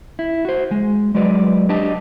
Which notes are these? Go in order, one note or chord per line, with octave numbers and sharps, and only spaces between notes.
E4
F#4 C5
G#3
F#3 G#3 F#4 B4 D5
D4 G4 D5 D#5 A5